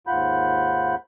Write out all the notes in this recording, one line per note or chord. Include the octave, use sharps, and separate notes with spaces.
D#2 G#2 F4 F#5 B5 G6